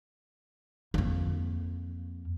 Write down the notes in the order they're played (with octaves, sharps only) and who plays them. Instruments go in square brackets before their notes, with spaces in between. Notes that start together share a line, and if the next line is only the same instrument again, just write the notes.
[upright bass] F2 A#3